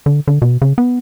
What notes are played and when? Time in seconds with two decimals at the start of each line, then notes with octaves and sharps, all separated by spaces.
0.06 D3
0.28 D3
0.42 B2
0.62 C#3
0.78 B3